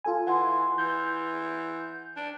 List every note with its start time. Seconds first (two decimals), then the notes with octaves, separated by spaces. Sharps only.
0.04 F4 A4 G#5
0.27 E3 F#5 C6
0.78 E3 G6
2.17 D4